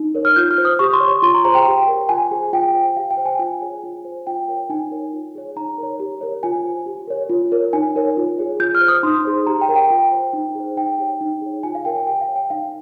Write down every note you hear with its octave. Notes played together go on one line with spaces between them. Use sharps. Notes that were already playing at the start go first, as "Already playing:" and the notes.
Already playing: D#4
A#4 C#5
F6
F4 G6
F6
C5
D#6
G4 C#6
C6
C#5
C#6
F4 C6
A#5
G#4 C5 A#5
G5
G4 G5
A#4 C#5
F4 G#5
G#4 C5
F4 G5
C5
G4 F5
G5
C5
G#5
F4 G#5
G#4 C#5
F4
C5
F4 G5
A#4 C#5
D#4 G#5
A#4 C#5
F4
G#4 C#5
D#4 A#5
A#4 C#5
G4
A#4 C#5
F4 G#5
C5
G4
A#4 C#5
F4
A#4 C#5
D#4 G#5
A#4 C#5
F4
G#4 C#5
F4 G6
F6
C5
D#6
D#4 C6
G#4 C5
G4 A#5
G5
A#4 C#5
G5
F4
C5
D#4
G#4 C5
D#4 G5
G4 C#5
D#4
G#4 C#5
F4 G#5
F5
A#4 C#5 G5
G#5
G4 G5
F5
C#5
G5
D#4 F5